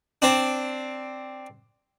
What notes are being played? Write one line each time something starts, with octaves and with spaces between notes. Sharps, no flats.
C4 D4